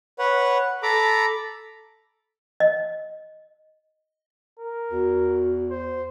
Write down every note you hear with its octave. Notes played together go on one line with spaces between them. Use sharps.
B4 C#5 F#5
A4 A#5 B5 D6
D#5
A#4
E2 F#4
C5